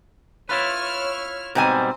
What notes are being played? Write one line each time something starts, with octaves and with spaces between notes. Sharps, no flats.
E4 F4 B4 C#5 F6
G#2 B2 G3 C4 C5 G#5